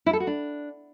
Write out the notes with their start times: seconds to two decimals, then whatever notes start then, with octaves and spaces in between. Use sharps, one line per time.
0.06 E4
0.13 A4
0.20 F#4
0.27 D4